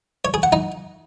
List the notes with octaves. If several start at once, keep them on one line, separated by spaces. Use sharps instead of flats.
C#5
G#4
F#5
D#4